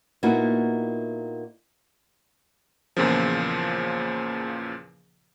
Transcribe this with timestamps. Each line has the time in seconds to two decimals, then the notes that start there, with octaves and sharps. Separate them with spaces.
0.23 A#2 A#3 B3 D#4 E4 F#4
2.97 E2 A#2 C#3 F3